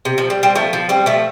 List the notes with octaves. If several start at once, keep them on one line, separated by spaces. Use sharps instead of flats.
C3
F3
G3
G3 C4
F3 A3
F3
G3 C4
F3 A3